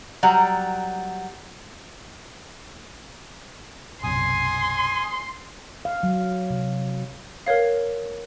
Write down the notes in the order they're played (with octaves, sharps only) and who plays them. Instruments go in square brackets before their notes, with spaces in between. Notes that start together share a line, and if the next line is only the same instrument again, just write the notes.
[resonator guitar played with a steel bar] F#3 G3 F#5 A#5
[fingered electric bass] F#1 B1 C3 [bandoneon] G#5 D#6 [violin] C6
[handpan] F5
F#3
C3
[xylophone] A#4 B4 C#5 F5